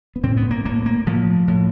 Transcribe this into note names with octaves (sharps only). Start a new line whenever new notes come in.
B3
A2 C4
B3
A#3
A2 A#3
A#3
A2 F3
A2